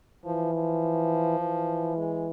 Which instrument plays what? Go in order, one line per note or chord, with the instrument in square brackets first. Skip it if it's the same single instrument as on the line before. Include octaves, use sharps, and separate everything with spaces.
[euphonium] E3 [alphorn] F3
[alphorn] F3
[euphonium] E3
[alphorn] G#3